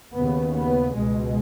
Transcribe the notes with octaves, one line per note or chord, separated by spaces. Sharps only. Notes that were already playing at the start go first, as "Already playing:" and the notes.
D#2 C#3 B3
B3
C#2 B2 G#3